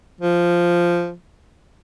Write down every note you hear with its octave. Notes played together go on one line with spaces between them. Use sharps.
F3